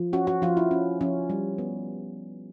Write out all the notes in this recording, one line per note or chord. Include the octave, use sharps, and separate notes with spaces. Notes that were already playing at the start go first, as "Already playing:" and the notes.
Already playing: F3
C#4 F#4
F#4
F3 F4
E4
C#4
F3 C#4
G3
B3